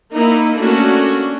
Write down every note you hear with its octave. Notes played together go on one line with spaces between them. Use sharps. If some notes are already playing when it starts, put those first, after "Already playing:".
A#3 D#4 E4
A3 A#3 C#4 D4 F#4